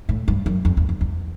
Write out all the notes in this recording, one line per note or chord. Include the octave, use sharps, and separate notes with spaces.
A2
G2
F#2
F2
E2
E2
E2